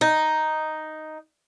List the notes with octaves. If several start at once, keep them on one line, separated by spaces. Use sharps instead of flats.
D#4